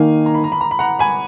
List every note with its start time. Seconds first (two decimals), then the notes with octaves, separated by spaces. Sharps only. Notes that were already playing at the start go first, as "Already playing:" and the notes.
Already playing: D#3 A#3 D#4 F5 G#5
0.26 A#5
0.34 B5
0.44 A#5
0.52 B5
0.61 A#5
0.71 B5
0.79 F#5 A#5
0.99 G#5 B5